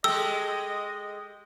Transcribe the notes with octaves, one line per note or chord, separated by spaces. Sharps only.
G#3 G4 A4 D#5 E6